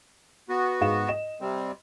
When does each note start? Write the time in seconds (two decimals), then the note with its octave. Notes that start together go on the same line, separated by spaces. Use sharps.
0.49 B3 F#4
0.81 G#2 F5 E7
1.09 D#5 E7
1.41 C3 G3 C4